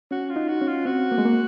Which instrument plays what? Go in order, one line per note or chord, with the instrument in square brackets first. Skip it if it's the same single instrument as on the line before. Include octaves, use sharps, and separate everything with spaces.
[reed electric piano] C#4 [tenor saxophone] F#4
[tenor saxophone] F4
[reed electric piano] D#4
[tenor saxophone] F#4
[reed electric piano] C#4
[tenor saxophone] F4
[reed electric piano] C4 [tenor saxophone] F#4
[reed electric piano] A#3
G#3
A#3